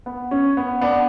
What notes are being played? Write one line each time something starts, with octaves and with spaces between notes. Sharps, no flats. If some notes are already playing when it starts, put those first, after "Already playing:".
B3
C#4
B3
B3 D4